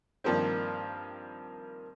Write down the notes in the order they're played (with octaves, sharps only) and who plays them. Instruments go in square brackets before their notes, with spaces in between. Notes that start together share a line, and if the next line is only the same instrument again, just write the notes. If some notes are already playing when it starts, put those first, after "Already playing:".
[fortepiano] G2 D#3 F3 A#3 C4